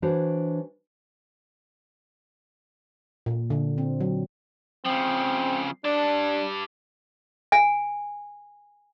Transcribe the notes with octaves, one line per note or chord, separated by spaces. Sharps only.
E3 D4 F#4 C5 C#5
A#2
D3
C4
F#3
C#3 F3 C4
D4 G4 A5
G#5